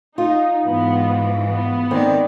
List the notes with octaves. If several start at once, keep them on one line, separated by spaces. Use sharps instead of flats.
D#4 F4
G#2 E3 B3
B3
D#3 C4 D5